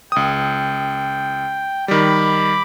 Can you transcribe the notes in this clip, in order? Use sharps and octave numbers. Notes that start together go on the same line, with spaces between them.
C#2 G5 D#6
D#3 G3 B5 D6